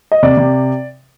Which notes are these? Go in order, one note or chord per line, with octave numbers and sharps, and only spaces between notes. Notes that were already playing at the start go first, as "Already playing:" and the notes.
D#5
C3 D5
C3